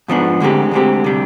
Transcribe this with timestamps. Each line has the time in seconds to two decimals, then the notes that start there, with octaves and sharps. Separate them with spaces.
0.08 G#2 F3 B3 D4
0.40 D2 D3 G#3 C4 G4
0.71 D2 D3 G#3 C4 G4
1.04 C3 G3 D4